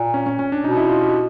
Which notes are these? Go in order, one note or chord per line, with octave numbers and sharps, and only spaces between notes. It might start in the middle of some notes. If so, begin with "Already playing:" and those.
Already playing: A#2
C#4
C#4
C#4
D4
B2 D#4
E4
F4
G4